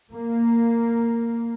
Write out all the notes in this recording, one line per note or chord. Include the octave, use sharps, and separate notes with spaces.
A#3